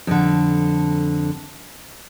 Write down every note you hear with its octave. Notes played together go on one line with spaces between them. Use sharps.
F2 D3